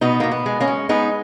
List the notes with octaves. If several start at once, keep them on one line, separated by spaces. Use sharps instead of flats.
B2 B3 D#4
B2 A#3
B3
G#3
A#3 C#4
G#3
G#3 B3 D#4